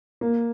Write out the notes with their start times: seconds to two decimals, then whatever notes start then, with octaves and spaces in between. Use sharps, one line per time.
0.21 A#3